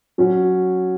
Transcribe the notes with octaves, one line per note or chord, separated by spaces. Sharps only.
F#3 C#4 F#4 C#5